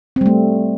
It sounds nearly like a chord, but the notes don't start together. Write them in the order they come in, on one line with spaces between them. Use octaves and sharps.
C4 G3 A3